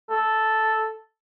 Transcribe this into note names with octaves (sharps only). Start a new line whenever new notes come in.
A4